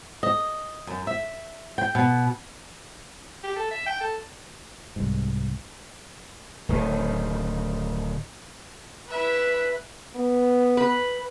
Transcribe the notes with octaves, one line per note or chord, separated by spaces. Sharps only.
D#5
F#2
E5
G5
B2
G4
A4
E5
G5
A4
C2 G#2
D1 D#3
E4 B4 E5
B3
B4